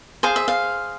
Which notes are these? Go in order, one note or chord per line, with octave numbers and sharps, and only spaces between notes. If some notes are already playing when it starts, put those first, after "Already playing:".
G#4 C5 F5
E5
F5